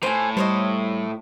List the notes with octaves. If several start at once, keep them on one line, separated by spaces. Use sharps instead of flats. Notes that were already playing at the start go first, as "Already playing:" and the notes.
A2 C5 G#5
G3 C5 C#5 D#5